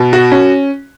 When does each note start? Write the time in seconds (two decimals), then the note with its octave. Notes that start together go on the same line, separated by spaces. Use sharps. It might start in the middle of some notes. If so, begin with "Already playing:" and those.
Already playing: B2
0.13 F#4
0.32 C#4